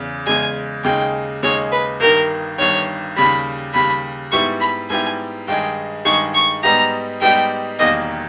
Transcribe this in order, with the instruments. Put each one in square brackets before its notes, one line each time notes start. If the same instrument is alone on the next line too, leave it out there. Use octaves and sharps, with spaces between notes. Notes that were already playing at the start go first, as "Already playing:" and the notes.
Already playing: [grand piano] E2 C#3
[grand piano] E2 C#3 G#3 [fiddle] G#5
[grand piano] D#2 C#3 G#3 D#4 G#4 [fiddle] G5
[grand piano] D#2 C#3 G#3 D#4 G#4 [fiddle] C#5
[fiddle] B4
[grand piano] G1 G2 D#3 [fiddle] A#4
[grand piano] G1 G2 D#3 [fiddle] C#5
[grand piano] D#2 C#3 G3 [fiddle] B5
[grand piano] D#2 C#3 G3 [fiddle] B5
[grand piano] G#2 G3 B3 E4 G4 [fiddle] C#6
[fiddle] B5
[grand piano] G#2 G3 B3 E4 G4 [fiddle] G#5
[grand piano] G2 D#3 G#3 D#4 G#4 [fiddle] G5
[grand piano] G2 D#3 G#3 D#4 G#4 [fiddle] C#6
[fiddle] C#6
[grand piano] G#2 G3 B3 D#4 G4 [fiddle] A#5
[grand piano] G#2 G3 B3 D#4 G4 [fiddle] G5
[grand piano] E1 E2 D#3 G3 A#3 [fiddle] D#5